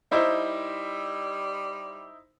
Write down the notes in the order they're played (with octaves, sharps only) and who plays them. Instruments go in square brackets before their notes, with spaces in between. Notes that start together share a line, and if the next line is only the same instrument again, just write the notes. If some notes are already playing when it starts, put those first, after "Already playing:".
[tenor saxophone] G3 [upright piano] D#4 E4 C5